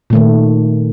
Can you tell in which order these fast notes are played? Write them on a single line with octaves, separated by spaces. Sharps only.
A#2 A3 D#3